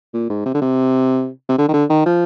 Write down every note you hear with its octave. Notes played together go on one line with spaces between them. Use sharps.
A#2
G#2
C3
D3
C3
C3
D3
D#3
D3
D#3
F3